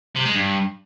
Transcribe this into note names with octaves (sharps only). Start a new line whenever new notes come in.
C3
G#3
G2